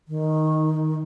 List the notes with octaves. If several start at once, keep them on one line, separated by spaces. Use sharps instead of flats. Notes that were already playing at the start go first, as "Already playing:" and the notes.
D#3